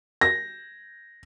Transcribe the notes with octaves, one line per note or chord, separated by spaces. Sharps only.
A#6